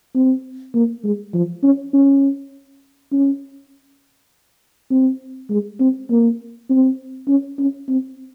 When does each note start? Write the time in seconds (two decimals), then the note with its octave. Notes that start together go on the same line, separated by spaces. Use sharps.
0.15 C4
0.75 A#3
1.04 G#3
1.34 F3
1.63 C#4
1.93 C#4
3.12 C#4
4.91 C4
5.50 G#3
5.80 C4
6.10 A#3
6.70 C4
7.28 C#4
7.59 C#4
7.88 C4